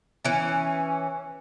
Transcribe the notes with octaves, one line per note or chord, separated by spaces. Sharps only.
E3 C#4